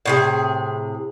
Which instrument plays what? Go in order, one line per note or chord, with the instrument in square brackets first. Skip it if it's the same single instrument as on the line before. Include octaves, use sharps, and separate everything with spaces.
[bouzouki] A2 C3 G#4